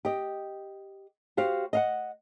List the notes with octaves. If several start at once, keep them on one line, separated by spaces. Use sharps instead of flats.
G4 D#5
F#4 G4 C5 F5
D#5 F5 F#5